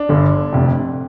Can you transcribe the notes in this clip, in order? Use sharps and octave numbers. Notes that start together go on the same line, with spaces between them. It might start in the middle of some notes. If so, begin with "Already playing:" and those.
Already playing: D4
G1 G2 D3
F1 F2 C3